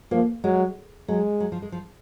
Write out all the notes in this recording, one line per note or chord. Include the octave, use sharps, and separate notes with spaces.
F3 A#3
F#3 G#3
F#3 G#3
F#3
F3
G#3
F3